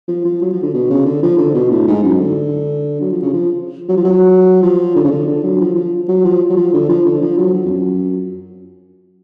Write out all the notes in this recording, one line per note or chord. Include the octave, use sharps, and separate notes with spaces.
F3
F3
F#3
F3
D3
B2
C#3
D3
F3
D3
B2
A2
G#2
F#2
D3
F#3
F3
C#3
F3
F#3
F3
F#3
F3
D3
C#3
D3
D3
F#3
F3
F3
F#3
F3
F#3
F3
D3
F3
D3
F3
F#3
F3
F2
F#2